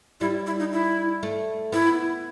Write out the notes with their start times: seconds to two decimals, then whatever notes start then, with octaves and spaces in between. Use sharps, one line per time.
0.21 G3 E4
0.47 E4
0.59 D#4
0.72 E4
1.23 A3
1.72 B3 E4